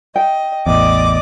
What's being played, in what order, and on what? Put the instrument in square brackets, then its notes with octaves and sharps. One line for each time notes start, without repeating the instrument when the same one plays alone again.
[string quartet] D#5 [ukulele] G5
[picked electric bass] A1 E2 [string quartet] D5 D#5 D6